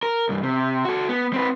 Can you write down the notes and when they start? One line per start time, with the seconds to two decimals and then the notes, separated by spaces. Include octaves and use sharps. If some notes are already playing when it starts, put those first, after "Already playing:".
0.03 A#4
0.29 C2 G2
0.43 C3
0.85 F#4 A4
1.09 B3
1.33 C4 B4